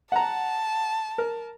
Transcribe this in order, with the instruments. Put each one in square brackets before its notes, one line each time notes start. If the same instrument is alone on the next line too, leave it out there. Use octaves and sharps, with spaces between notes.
[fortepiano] F#5 A#5 [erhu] A5
[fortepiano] A#4